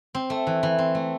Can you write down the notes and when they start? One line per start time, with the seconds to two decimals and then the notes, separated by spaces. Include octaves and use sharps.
0.15 C4
0.30 A3
0.47 E3
0.63 E3
0.78 C4
0.95 A3